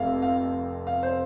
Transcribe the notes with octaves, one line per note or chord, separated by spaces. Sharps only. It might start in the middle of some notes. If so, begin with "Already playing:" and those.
Already playing: F1 F2 C3 E5 F5
F5
F5
C5